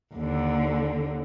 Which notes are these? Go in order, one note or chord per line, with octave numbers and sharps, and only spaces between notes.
D#2 D3